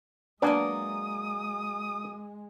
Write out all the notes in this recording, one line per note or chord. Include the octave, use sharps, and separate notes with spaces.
F#3 G#3 A#3 B3 D4 D5 G#5 D#6